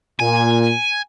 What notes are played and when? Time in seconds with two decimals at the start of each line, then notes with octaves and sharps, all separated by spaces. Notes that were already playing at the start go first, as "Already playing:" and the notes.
0.20 A#2 G#5